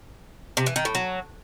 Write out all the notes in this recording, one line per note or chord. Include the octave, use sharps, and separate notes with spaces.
C3
E3
D#3
A2
F#3